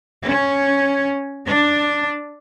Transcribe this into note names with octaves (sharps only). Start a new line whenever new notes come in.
C#4
D4